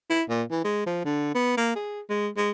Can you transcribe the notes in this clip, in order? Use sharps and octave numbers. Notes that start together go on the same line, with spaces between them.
E4
A#2
E3
G#3
F3
D3
B3
A#3
G#4
G#3
G#3